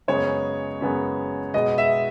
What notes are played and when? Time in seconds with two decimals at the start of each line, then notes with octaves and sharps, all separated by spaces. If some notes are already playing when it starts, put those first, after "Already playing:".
0.08 F#2 C#3 G#3 B3 C#5
0.81 F#2 C#3 G#3 B3
1.54 B2 G#3 B3 D#5
1.78 E5